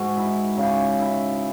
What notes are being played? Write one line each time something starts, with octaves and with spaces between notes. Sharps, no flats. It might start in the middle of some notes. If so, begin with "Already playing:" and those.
Already playing: G#2 F#4
E4
C#3
E4